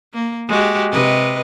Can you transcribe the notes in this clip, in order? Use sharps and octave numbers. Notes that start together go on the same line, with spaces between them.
A#3
G#3 F#4 G4
C3 B4 D#5